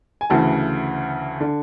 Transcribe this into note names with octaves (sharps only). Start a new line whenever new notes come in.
G#5
D2 C#3 E3 A5
D3